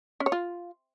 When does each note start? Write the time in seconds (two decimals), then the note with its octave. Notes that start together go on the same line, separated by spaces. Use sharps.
0.20 C#4
0.26 C#5
0.32 F4